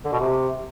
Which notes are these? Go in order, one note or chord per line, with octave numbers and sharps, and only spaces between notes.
D3
B2
C3